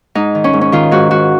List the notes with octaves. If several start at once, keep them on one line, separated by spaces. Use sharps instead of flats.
G#2 D#4
D#3
C#4
G#2
C#4
D#3 F4
G#2 F#4
G#2 F#4